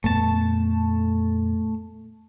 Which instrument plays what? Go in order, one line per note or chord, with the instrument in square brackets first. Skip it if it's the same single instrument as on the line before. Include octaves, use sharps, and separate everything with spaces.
[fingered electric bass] F2 A#2 B3 [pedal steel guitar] A3 A5